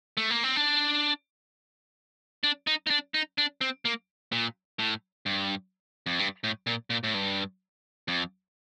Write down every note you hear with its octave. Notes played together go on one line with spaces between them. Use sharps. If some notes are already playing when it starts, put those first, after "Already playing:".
A3
A#3
C4
D4
D4
D#4
D#4
D4
D#4
D4
C4
A#3
A#2
A2
G2
F2
G2
A2
A#2
A#2
A2
G2
F2